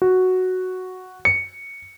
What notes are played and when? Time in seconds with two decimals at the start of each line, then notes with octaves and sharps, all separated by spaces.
0.02 F#4
1.25 C#7